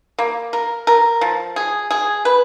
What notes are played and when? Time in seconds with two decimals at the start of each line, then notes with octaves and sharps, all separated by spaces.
0.19 A#3
0.53 A#4
0.87 A#4
1.21 F3
1.56 G#4
1.91 G#4
2.25 B4